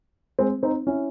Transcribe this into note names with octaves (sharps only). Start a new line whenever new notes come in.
G#3 C4
C4 D#4
C#4 E4